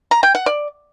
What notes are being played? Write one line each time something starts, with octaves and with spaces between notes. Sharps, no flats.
A#5
G5
F#5
D5